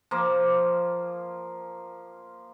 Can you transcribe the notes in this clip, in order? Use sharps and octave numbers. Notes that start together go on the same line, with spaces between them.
F3 A#3